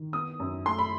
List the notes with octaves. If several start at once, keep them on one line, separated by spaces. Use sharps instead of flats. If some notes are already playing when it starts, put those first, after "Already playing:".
Already playing: D#3
B3 D#6
F#2
A3 C6
B5